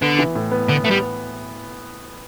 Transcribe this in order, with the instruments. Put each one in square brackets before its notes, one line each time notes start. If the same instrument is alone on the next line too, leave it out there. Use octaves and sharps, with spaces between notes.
[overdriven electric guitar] D3 [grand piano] B3
[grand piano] E3
A2
B3
[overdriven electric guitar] D3 [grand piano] B3
[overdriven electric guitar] A3 [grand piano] B3
[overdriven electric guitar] G3